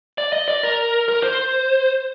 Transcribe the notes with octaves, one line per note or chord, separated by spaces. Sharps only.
D5
D#5
D5
A#4
A#4
C5